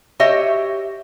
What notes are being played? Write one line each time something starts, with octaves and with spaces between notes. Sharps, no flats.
F#4 G4 C#5 D#5 E5